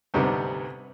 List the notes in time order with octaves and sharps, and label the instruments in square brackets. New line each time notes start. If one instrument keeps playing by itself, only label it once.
[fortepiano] D2 G#2 C3 G3 B3